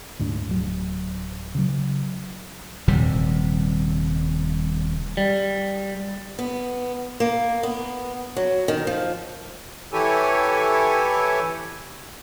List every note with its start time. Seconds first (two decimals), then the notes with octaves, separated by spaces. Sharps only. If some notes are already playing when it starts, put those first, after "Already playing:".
0.19 D2 G#2 D4
0.47 D1 F#3
1.55 C#3 F#3
2.88 D#1 C3 G3
5.17 G3
6.39 B3
7.20 A#3
7.63 B3
8.36 F#3
8.68 D#3
8.87 F3
9.93 E3 E4 G4 A4 C#5 G#5